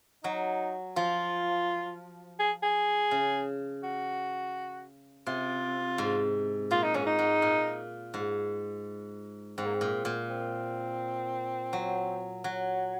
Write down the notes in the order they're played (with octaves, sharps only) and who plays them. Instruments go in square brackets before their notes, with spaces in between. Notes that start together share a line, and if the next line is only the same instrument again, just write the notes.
[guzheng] F#3 [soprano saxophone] D#4
[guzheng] F3 [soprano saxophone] F4
[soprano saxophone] G#4
G#4
[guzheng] C#3
[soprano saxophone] F#4
[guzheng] C3 [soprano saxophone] F4
[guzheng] G#2
[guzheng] A#2 [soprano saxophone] F4
[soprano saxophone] D#4
[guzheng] G#2 [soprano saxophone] C#4
[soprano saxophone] D#4
[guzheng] G#2
A#2
G#2
[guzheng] G#2 [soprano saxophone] C4
[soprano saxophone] A#3
C4
[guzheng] A#2
A#2
[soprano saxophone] C4
[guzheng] F#3
F#3